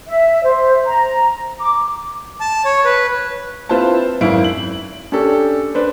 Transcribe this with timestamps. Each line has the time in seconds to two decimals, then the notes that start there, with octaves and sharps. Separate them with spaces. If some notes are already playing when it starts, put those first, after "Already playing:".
0.07 E5
0.44 C5
0.86 A#5
1.60 D6
2.40 A5
2.65 C#5
2.85 B4
3.69 C4 E4 F4 B4 C5 A5
4.21 G#1 F#2 E4 F5 D7
4.44 F#7
5.12 C#4 D4 G4 A4
5.75 D4 B4 C5